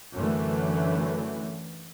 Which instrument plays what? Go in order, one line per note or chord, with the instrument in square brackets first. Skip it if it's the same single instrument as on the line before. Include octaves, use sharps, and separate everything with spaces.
[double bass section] F#2 D3 E3 A3